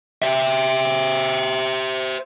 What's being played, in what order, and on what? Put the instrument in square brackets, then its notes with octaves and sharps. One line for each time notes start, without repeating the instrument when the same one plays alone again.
[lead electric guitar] C5 E5